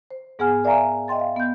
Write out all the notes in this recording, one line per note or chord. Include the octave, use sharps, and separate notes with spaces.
C5
G#2 B3 G#4 F#5 G#5 F6
A#4 D5 E5 F5 G#5 A#5
D#5 E5 G5 C6 A6
F5
B3 G6